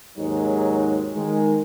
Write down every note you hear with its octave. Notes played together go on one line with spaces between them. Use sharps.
D#2 G#2 F#3 G#3 D#4
D#3 G#3